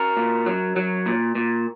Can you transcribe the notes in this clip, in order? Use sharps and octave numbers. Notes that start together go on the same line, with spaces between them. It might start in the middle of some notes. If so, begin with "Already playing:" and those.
Already playing: F#4 A#4
A#2
F#3
F#3
A#2
A#2